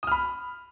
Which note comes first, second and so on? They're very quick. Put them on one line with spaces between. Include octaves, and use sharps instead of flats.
D#6 F6 B5